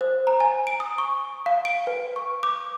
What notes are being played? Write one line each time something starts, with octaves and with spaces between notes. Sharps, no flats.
C5
A#5
G#5
D7
D#6
C#6
F5
D7
B4
C#6
D6